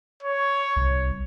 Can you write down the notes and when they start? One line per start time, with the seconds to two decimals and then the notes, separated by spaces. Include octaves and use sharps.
0.23 C#5
0.76 C2